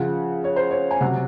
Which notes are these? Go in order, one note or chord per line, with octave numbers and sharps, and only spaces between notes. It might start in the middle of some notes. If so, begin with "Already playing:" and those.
Already playing: C#3 F3 F#5
C#5
C5
C#5
G#5
C3 F#3 F#5